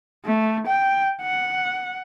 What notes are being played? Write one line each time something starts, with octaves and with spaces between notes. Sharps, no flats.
A3
G5
F#5